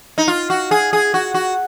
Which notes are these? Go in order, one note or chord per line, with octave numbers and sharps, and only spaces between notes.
D#4
F4
F#4
G#4
G#4
F#4
F#4